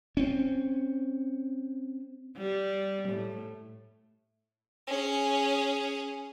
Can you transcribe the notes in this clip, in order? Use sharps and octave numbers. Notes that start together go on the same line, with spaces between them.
C4 C#4
G3
A2
C#4 G#4